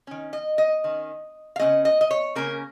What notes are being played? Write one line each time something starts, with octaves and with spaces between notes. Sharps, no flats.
D#3 C#4
D#5
D#5
D#3 C#4
F5
C#3 G#3 C#4 D#5
D#5
D#5
C#5
C#3 A#3 C#4 A#4